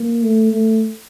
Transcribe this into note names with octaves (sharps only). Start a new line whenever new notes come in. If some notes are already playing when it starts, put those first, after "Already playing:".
Already playing: A#3
A3
A3